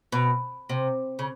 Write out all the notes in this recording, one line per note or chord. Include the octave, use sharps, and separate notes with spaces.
B2
C3
C#3